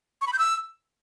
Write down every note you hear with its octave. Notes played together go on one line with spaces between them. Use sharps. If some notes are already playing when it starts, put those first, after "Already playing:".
C#6
B5
G6
E6